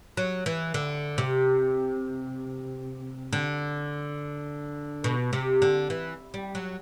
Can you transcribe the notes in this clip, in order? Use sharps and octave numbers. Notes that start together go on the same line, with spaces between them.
F#3
E3
D3
C3
D3
B2
C3
D3
E3
G3
F#3